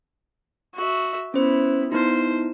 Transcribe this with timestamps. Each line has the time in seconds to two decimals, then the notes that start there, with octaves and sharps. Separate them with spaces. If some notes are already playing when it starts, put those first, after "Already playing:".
0.75 F#4 E5
1.34 B3 C#4 E4 C5
1.92 B3 D#4 E4 C5